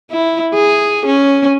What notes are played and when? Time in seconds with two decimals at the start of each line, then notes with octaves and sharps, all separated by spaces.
0.11 E4
0.54 G#4
1.06 C#4